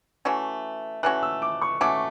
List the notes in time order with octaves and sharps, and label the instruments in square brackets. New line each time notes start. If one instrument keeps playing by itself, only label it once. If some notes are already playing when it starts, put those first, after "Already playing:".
[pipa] E3 A3 C#4 F#4
[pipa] E3 A3 C#4 F#4 [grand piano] F#6
[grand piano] E6
D6
C#6
[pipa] E3 A3 C#4 F#4 [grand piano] D6